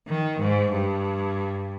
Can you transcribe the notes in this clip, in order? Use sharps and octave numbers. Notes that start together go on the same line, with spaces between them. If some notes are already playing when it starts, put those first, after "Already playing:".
D#3
G#2
G2